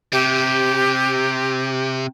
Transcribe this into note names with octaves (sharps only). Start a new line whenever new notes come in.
C3 G4